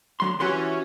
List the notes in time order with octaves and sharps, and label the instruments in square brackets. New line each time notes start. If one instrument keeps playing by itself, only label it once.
[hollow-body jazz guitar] D3 F#3 C6
[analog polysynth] E3 C#4 [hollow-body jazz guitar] F#4 G4 C6